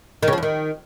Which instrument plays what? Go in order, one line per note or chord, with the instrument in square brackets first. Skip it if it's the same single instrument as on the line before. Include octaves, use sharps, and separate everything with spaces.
[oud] D#3
C#3
F3
E2
D#3